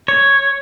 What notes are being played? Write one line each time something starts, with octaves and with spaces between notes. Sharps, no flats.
C#5